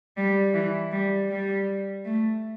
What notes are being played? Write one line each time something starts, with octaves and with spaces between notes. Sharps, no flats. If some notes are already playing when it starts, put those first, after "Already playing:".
G3
E3
G3
G3
A3